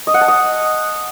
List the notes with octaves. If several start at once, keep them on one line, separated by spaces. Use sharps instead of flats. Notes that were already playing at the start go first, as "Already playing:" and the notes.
D#5
F#5
A5
D#5